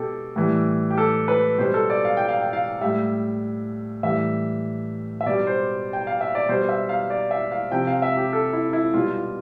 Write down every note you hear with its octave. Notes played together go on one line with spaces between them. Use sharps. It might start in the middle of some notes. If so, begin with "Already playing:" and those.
Already playing: B2 G4 A4
A2 E3 G3
G4
A4
B4
B2 G3 C5
A4
D5
F5
G5
F5
G5
F5
A2 G3 E5
A2 E3 G3 E5
E5
B2 G3 D5
C5
G5
F5
E5
D5
B2 G3 C5
E5
F5
D5
E5
F5
C3 F3 G5
F5
E5
G4
A4
E4
E4
B2 G3 F4
F4